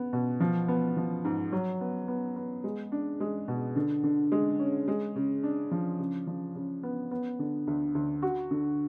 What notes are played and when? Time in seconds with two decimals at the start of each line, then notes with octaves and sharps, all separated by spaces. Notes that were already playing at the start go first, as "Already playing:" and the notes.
Already playing: B3
0.13 B2
0.40 F3
0.68 B3
0.97 F3
1.25 G#2
1.52 F#3
1.81 B3
2.08 B3
2.36 B3
2.64 G#3
2.92 D4
3.20 G#3
3.48 B2
3.76 D3
4.03 D3
4.32 G#3
4.59 C#4
4.88 G#3
5.16 C#3
5.43 D4
5.71 F3
5.99 C#3
6.27 F3
6.55 C#3
6.83 B3
7.11 B3
7.39 D3
7.67 D2
7.95 D2
8.22 F#4
8.51 D3